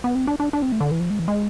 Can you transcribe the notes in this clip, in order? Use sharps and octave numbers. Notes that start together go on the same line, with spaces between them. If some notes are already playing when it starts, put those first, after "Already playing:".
B3
C4
D4
D4
D4
C4
A3
D3
E3
F3
G#3
E3
G#3